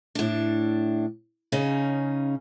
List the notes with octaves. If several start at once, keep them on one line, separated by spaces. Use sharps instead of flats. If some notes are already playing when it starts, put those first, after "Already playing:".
A2 D4
C#3 C#4 D#4